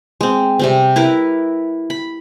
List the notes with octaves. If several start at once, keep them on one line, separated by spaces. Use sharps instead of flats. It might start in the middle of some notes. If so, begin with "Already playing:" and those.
G#3 C4
C3 G3 C4
E4 A#4 B4
B5